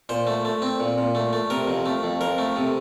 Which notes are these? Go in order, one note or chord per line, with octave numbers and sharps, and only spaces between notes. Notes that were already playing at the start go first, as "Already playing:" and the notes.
A#2 C5
A3
A3
C4
A#2
A#2
A3
A3
C3 A#4
F2
A3
F2
F2 A#4
A3
C3